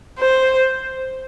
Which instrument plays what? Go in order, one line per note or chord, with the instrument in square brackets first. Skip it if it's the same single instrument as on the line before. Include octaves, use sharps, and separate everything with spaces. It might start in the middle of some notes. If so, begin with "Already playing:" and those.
[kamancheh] C5